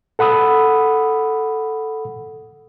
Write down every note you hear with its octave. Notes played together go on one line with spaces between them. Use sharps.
A4 F#5 B5 D#6 E6